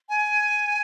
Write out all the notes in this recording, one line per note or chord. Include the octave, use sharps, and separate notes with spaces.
G#5